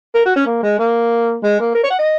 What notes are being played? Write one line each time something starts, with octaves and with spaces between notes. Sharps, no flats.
A#4
F#4
C#4
A#3
G#3
A#3
G#3
A#3
A#4
C#5
F#5
D#5